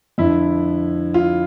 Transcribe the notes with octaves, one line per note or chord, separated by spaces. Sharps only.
F2 D3 E4
F4